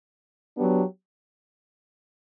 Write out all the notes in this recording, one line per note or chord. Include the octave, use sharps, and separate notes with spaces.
F#3 B3 D4 G4